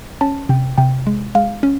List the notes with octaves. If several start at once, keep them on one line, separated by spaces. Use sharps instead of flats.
C#4 A5
C3 G5
C3 G5
G#3
G#3 F5
C#4